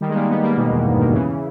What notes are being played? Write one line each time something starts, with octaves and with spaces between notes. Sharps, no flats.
D#3 G3
G#3
G3 A#3
G#3 B3
G3 A#3
G#2 B2
E2 G#2
G2
B2 D#3
C#3 E3